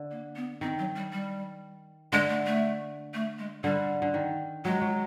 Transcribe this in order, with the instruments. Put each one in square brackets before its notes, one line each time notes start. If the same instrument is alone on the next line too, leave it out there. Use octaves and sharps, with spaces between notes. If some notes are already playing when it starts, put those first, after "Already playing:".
Already playing: [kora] D3
[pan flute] A#3
B3
[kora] D#3 [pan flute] C4
[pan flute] F#3
G3
G3
[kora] D3 [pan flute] G#3
[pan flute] A3
A3
A3
G#3
[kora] D3 [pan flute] G3
[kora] D3
D#3
[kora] F#3 [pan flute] G#3
[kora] F#3